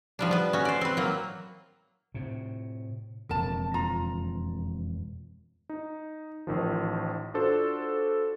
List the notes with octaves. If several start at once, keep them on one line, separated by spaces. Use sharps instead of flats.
F3 G3 D4
B3 B4
C#4 F#4
C5 D5
C4 B4
F#3 A#3
A2 C3
E1 F2 C#3 A#4 A5
F4 A#5
D#4
A1 D#3 F3
D4 F4 F#4 A4 C5